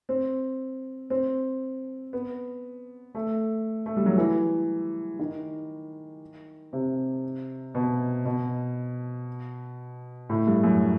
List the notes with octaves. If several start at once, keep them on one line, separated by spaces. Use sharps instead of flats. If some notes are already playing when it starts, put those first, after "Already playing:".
C4
C4
B3
A3
A3
G3
F#3
E3
D#3
C3
B2
B2
A2
G2
F#2